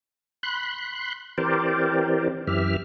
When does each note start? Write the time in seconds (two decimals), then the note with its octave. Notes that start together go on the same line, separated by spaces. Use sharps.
0.43 B5 C6 F#6
1.38 E3 C4 G4 A#4 C5 D5
2.47 F#2 E3 G4 E5 F6